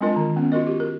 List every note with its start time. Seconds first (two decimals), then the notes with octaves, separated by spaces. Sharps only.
0.01 G#3 C4 D4 F4 A#4 D#5
0.16 D#3
0.36 B3 C#4
0.52 F4 F#4 A#4 D#5
0.67 F#4 G4
0.80 A#4